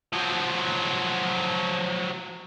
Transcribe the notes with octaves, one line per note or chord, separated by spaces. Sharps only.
F3 F#3